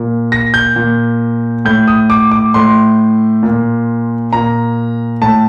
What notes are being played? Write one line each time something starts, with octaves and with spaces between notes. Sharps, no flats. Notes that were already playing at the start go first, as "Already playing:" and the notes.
Already playing: A#2
A#6
G6
A#2
A2 G6
D#6
D6
D6
A2 C6
A#2
A#2 A#5
A2 A5